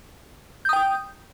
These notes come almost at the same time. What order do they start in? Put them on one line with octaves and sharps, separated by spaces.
G6 D#6 G5